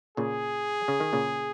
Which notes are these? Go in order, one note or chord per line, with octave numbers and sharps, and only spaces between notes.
A#2 C#3 G#4
C#3
D#3
A#2 C#3